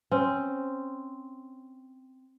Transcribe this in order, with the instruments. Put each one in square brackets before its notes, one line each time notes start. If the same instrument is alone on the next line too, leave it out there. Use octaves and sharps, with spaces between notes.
[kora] C4 C#4